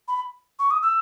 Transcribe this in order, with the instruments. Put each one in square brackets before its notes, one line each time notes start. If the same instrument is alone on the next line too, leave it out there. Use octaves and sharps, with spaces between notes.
[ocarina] B5
C#6
D#6
E6